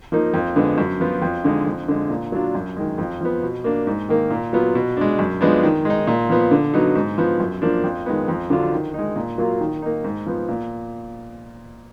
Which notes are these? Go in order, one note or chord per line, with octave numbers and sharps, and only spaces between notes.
F3 A#3 D#4
F2
D3 G#3 B3
F#2
F3 B3 F4
F2
D3 G#3 D#4
F2
D3 G#3
A#2
F#3 D4 F4
F#2
D#3 G#3
F2
F3 B3
B2
A#3 D4
G#2
D#3 A#3
A#2
F#3 B3 F4
B2
G#3 D4
F#2
F3 G#3 B3 D4
D#3
G#3 D#4
A#2
F3 B3
D3
F#3 B3 D#4
G#2
F3 B3
F#2
F3 A#3 D4
F2
D#3 G#3 B3
F2
D3 F#3 D4 F4
D#3
G#3 D#4
A#2
F#3 A#3 F4
D#3
A#3 D#4
G#2
F3 B3
A#2